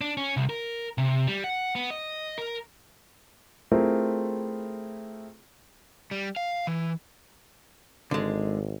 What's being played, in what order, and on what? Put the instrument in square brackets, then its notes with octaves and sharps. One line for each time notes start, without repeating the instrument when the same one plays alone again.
[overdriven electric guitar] D4
C#4
C2
A#4
C3
G3
F#5
B3
D#5
A#4
[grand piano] A3 C4 E4 F4 G#4 A#4
[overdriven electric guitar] G3
F5
E3
[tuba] G#1 [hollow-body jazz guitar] D3 G#3